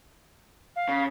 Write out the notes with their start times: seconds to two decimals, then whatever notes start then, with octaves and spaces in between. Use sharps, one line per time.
0.76 F5
0.88 C#3